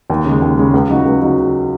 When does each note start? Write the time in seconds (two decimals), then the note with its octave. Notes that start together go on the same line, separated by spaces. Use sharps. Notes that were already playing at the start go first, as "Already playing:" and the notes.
0.10 D#2
0.25 C#3 G#3
0.42 D#2
0.57 C#3 G#3
0.74 C#2
0.90 C#3 F#3 D#4 F#4
1.05 C#2
1.21 C#3 F#3 D#4 F#4